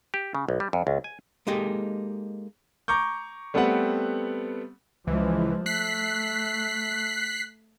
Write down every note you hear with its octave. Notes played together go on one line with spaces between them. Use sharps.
G4
C#3
B1
G3
F2
C#2
G#5
G#3 A#3 D#4 G4 A4
A#5 C#6 D6 G6
G3 A3 B3 C4 B4 F#5
C#2 E3 F3 G#3
A3 F#6 B6 C7